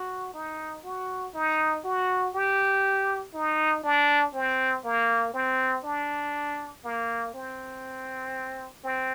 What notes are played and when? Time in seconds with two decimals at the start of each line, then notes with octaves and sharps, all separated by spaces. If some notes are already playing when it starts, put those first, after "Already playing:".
Already playing: F#4
0.34 D#4
0.84 F#4
1.34 D#4
1.84 F#4
2.34 G4
3.34 D#4
3.84 D4
4.34 C4
4.85 A#3
5.34 C4
5.84 D4
6.84 A#3
7.34 C4
8.84 C4